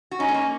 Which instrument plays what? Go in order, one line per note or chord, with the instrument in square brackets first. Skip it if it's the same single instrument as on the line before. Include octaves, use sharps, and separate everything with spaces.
[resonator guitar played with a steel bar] F#4
[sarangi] C#4 [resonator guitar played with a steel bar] D#4
[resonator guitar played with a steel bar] G#3
A#3